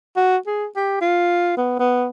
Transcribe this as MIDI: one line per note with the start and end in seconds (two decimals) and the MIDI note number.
0.16 0.37 66
0.47 0.66 68
0.76 0.97 67
1.01 1.57 65
1.57 1.76 59
1.79 2.07 59